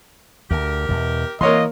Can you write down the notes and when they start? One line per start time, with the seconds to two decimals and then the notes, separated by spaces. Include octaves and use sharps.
0.51 D2 G4 A#4
0.89 E2 B2
1.41 C3 E3 F#3 A#3 F4 C#5 D#5 C6